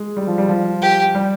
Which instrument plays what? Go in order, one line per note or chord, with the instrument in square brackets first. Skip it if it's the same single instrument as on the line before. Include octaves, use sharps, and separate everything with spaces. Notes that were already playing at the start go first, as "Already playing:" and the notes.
Already playing: [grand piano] G#3
G3
F3
G3
F3
[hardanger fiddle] G4
[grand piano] G3